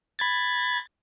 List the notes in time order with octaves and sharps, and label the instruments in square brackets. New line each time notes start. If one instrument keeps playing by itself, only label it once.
[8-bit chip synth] B5 G#6 A6